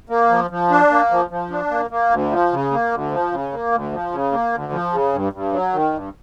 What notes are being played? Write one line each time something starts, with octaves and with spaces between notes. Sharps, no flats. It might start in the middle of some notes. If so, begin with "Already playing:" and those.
A#3
F3
F3
D4
A#3
F3
F3
D4
A#3
A#3
D2
F3
C#3
A#3
D2
F3
C#3
A#3
D2
F3
C#3
A#3
D2
F3
C#3
G2
G2
F#3
D#3
G2